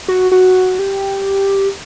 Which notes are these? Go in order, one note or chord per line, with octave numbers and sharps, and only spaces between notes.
F#4
F#4
G4